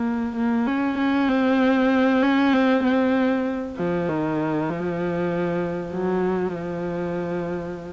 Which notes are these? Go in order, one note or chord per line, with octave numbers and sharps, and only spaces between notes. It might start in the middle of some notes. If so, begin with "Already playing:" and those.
Already playing: A#3
A#3
C#4
C#4
C4
C#4
C4
C4
F3
D#3
F3
F#3
F3